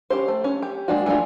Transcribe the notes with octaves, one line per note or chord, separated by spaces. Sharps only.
C#4 G4 C5
A3
C#4
G4
G#3 A#3 D4 F4 F#4
E3 A3 C#4 D4 F4